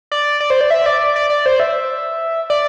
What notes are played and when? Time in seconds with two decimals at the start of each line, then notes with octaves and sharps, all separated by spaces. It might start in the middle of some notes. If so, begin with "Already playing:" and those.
0.12 D5
0.40 D5
0.50 C5
0.61 D5
0.70 E5
0.86 D5
1.01 D5
1.16 D5
1.30 D5
1.46 C5
1.60 E5
2.50 D5